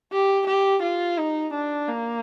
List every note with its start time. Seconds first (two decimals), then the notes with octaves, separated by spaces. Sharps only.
0.12 G4
0.47 G4
0.82 F4
1.17 D#4
1.53 D4
1.88 A#3